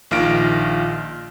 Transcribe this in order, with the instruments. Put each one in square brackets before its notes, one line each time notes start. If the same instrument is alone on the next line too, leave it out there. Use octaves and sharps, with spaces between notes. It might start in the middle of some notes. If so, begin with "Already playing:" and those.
[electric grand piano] A#1 D#3 F4 F6 A#6 D7